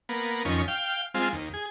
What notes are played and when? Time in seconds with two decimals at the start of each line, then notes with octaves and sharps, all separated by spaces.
0.09 A#3 B3
0.45 F2 D#3 C#4
0.68 F5 G5
1.14 G#3 C4 F4
1.33 D#2
1.54 G#4